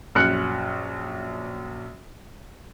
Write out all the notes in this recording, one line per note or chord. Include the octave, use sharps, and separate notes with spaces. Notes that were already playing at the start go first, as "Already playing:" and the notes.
A#1 F#2 F6 F#6 C#7